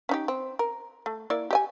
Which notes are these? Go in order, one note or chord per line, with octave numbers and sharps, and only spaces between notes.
C#4 D#4 G4
C4
A#4
A3
A#3 E4 D5
G4 D#5 G#5